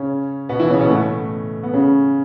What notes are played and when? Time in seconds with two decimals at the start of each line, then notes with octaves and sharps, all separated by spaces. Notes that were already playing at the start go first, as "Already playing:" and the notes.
Already playing: C#3 C#4
0.49 B2 B3
0.59 E3 E4
0.70 C#3 C#4
0.80 B2 B3
0.90 A2 A3
1.63 B3
1.73 C#3 C#4